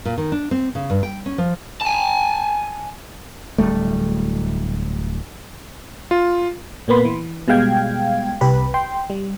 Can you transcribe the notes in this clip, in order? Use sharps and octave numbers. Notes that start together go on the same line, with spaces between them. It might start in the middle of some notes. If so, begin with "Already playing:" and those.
A#2
D#3
D4
C4
C#3
G2
G5
C#4
F3
G#5 A5
D1 G3 A3
F4
A#2 A#3 B3 B5 C6
E3
B2 G3 G#3 F5 G5 G#6
C2 C3 G4 B4 B5
G5 C6
G3